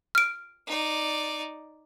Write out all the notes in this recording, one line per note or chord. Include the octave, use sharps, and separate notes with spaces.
F6 D7
D#4 D5